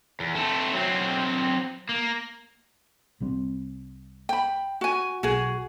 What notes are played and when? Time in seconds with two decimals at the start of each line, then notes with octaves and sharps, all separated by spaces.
0.20 E2
0.35 A3 C4
0.74 F#3 C4
1.89 A#3
3.20 C2 G3 C4
4.29 G5 B5
4.81 F#4 G#5
5.23 B1 F#4 G#4